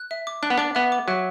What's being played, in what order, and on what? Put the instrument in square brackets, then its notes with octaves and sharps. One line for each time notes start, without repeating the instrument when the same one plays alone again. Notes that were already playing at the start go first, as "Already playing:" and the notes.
Already playing: [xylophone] F#6
E5
D6
[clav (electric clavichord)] D4 [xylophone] F#6
[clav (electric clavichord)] B3
[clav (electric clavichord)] D4 [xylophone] D6
[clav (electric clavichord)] B3 [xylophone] E5
[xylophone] D6
[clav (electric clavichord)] F#3 [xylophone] E5